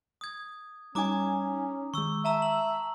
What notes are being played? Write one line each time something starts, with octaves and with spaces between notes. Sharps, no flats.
D#6 G#6
G3 C#4 D#4 G#5 A#5 D6 D#6
D#3 G#3 C#6 E6
E5 A5 A#5 E6
F#7